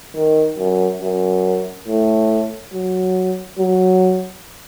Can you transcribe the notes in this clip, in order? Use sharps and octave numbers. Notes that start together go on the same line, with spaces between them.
D#3
F#2
F#2
A2
F#3
F#3